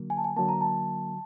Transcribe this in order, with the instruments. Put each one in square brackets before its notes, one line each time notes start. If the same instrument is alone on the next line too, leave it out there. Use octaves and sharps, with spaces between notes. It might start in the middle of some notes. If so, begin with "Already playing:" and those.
Already playing: [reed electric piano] D3 F#3 A#3
[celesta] G#5
A5
G#5
[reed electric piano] D3 F#3 A#3 [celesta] A5
[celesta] A#5
A5